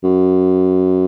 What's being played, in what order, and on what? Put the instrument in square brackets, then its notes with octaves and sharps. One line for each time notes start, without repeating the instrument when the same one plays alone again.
[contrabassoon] F#2